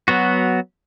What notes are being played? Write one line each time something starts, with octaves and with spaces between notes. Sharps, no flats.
F#3 B3 F#4